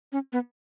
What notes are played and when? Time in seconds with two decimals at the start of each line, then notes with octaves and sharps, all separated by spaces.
0.12 C#4
0.33 B3